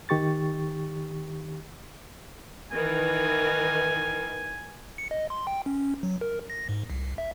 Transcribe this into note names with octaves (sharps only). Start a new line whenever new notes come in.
D#3 G4 C#6 A6
D#3 E3 G#5
C#7
D#5
C6
G5
C#4
F#3
A#4
A#6
G#2
C2
E5